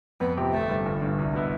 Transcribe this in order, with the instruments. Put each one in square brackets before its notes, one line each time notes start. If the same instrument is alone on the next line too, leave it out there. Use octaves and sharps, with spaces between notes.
[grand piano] F2 [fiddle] B3
[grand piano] C3 F3 C4 G4
[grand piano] G1 [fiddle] A3
[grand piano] G2 D3
G1
G2 D3
C2
B2 B3 E4